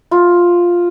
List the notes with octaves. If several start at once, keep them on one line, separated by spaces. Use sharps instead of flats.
F4